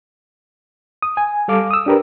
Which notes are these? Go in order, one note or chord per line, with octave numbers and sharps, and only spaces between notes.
D#6
G#5
G3 A4 F5 D6
D#6 E6
D4 G4 A#4 B4